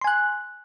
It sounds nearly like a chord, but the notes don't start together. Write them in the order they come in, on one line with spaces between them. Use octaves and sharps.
C6 G#5 F#6